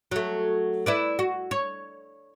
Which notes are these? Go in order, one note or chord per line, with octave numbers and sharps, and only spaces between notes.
F#3 A3
E4 B4 D5
F#4
C#5